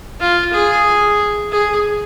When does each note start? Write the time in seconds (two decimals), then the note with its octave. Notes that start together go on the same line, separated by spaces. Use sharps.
0.20 F4
0.52 G#4
1.51 G#4